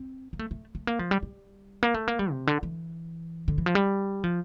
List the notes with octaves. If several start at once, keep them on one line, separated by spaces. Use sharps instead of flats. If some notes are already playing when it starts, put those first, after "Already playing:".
Already playing: C4
A#3
A3
A3
A3
A#3
F3
G3
G3
A#3
A3
A#3
G3
C3
D3
E3
D3
E3
F3
G3
F3